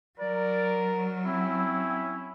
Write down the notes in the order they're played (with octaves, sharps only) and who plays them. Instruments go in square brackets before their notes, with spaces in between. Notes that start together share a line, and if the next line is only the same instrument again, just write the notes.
[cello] F#3 [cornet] A#4 [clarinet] D5
[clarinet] C4 [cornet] C#4 [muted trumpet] E4